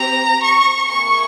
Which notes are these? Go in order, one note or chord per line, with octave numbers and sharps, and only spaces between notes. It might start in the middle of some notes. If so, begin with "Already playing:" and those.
Already playing: C4 G4 A#5
C#6
A#3 E4 G#4 C#6